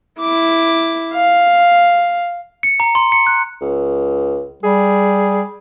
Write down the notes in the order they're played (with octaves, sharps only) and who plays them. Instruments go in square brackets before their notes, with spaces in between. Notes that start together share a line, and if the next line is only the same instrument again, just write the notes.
[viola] E4 D6
F5
[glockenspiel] C#7
A#5
C6
C#7
F#6
[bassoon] C#2
[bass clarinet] G3 [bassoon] G#4